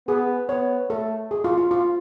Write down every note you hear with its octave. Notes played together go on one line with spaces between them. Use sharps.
B3 G#4
B3 C#5
A3 A4
G#4
F4
F4
F4